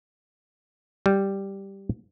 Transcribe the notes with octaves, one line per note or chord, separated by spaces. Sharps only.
G3